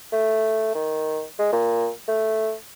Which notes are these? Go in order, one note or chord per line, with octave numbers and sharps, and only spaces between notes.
A3
D#3
G#3
A#2
A3